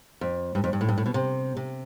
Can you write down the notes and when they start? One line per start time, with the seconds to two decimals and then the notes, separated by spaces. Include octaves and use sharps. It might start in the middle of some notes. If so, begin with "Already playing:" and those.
0.21 F2
0.55 G2
0.64 F2
0.73 G2
0.81 A2
0.89 G2
0.98 A2
1.06 B2
1.14 C3
1.57 C3